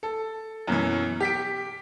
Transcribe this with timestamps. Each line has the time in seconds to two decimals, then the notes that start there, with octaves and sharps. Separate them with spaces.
0.03 A4
0.67 F#2 B2 E3
1.20 G4 B6 D7